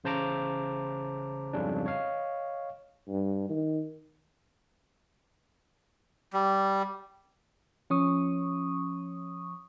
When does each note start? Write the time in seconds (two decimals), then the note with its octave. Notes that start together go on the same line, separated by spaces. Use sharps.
0.04 A1 C#3 C5 A5 A#5 D6
1.53 F2 G#2 C#3 G3 C#4 D4
1.86 C#5 D#5 F5
3.08 G2
3.49 D#3
6.33 G3
7.90 F3 C#4 C#6 D#6